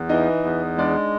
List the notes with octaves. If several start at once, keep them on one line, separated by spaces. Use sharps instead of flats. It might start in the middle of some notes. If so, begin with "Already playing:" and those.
Already playing: E2
E3 D#4 D#5
E2
G#3 D4 D5